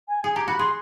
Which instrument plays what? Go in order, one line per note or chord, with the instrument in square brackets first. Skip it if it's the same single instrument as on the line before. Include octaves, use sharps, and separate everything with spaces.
[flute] G#5
[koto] G#4 [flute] G#5
[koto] G4 [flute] A#5
[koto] F#4 [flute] B5
[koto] G#4 [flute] C6